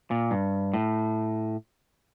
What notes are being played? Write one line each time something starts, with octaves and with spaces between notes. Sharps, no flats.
A#2
G2
A2